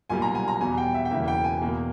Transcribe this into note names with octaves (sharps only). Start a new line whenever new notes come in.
B1 A#2 G3 A#3 G#5
A#5
G#5
A#5
E2 B2 G3 G#5
G5
E5
G5
E1 E2 C#3 E3 A#3 E5
G5
G#5
E2 B2 A#3